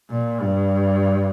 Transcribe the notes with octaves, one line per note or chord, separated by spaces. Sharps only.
A#2
G2